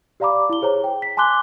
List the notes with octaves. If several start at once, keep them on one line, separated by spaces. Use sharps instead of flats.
G4 D5 F5 A#5 B5 D6
E4 G7
G#4 C5 C#5 A#5
G5
B6
G#5 A5 C6 D6 F#6 G7